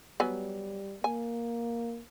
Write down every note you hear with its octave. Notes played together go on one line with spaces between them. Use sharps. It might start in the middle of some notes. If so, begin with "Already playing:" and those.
F#3 G3 B3 G#5
A#3 G#5